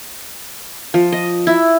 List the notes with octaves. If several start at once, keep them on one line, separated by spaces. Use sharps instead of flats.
F3
D#5
E4